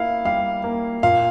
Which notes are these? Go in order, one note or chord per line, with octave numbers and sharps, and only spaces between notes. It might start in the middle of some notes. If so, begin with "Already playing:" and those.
Already playing: A#3 E4 F5
G3 F5
A#3
A#2 F5